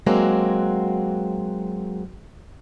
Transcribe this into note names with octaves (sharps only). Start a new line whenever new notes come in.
F#3 G#3 A#3 C4 F#4